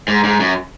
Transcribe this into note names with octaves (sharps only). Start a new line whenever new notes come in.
G#2
G#2
F#2